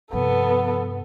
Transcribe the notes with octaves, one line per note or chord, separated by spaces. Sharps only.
G2 C3 F3 B3 A4